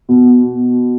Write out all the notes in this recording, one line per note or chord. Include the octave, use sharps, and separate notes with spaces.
B2